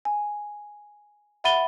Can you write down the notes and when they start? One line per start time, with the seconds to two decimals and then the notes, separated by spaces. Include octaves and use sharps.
0.05 G#5
1.44 E5 F#5 B5 A6 D#7 G7